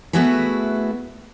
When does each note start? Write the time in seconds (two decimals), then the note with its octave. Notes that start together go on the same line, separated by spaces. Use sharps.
0.13 A3 B3 E4 F#4 G#4 B4